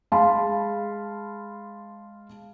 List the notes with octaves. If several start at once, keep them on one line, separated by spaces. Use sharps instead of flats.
G#3 F5 A5 B5 C6